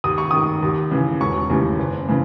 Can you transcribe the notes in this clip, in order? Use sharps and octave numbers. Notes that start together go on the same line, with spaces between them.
D#2 D#6
C#6
D#3 D#6
D#2
C#3 E3
E1 C#6
D#2 C#3 E3
F#1
C#3 E3